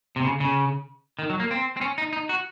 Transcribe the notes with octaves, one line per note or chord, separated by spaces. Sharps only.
C3
C#3
C#3
D#3
F#3
A#3
C4
C4
C#4
D#4
D#4
F#4